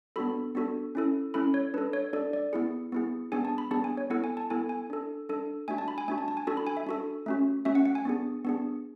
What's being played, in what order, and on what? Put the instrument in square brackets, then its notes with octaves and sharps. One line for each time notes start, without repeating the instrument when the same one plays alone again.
[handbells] B3 D4 F#4 A4 B5
B3 D4 F#4 A4
C#4 E4 A4
C#4 E4 A4 B5
C#5
D4 A4 B4
C#5
D4 A4 D5
D5
B3 E4 G#4
B3 E4 G#4
B3 D4 G#4 G#5
A5
B5
B3 D4 G#4 A5
G#5
C#5
B3 E4 A4 F#5
G#5
A5
B3 E4 A4 G#5
G#5
D4 A4
D4 A4
A3 D4 F#4 G#5
A5
B5
G#5
A3 D4 F#4 G#5
A5
A5
G#5
D4 F#4 A4 A5
B5
G#5
E5
D4 F#4 A4
A3 C#4 F#4
A3 C#4 F#4 E5
F#5
F#5
G#5
B3 D4 G#4
B3 D4 G#4